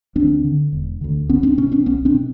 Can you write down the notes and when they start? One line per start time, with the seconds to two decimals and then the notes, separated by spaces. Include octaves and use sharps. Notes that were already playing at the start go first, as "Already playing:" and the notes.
0.15 D2 C4 D4
0.44 D3
0.73 E1
1.01 D2 D3
1.29 C#2 B3 C#4
1.43 C4 D4
1.57 B2 B3 C#4
1.72 C4 D4
1.86 C2 B3 C#4
2.05 C4 D4
2.14 B2